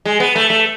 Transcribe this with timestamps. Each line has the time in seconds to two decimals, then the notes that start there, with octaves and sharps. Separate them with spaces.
0.05 G#3
0.20 B3
0.36 A3
0.50 A3